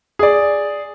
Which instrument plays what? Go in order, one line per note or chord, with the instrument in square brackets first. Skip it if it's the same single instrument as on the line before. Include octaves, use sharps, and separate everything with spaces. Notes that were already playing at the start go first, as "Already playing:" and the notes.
[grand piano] G#4 D5